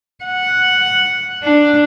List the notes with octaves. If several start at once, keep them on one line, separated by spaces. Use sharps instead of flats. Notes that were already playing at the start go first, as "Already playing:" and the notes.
F#5
D4